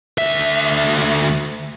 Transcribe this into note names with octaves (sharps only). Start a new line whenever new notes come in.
D2 E5